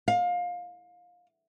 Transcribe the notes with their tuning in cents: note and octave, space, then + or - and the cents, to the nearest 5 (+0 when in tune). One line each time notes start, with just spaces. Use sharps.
F5 +25